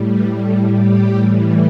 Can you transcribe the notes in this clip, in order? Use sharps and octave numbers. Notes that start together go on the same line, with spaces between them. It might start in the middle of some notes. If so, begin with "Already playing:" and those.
Already playing: A2 G3
B4
A4
G4
A2 E3 G3